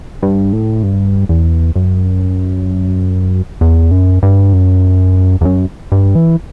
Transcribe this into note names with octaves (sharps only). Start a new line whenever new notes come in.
G2
A2
G2
E2
F#2
E2
F#2
G2
F#2
E2
F#2
G2
E3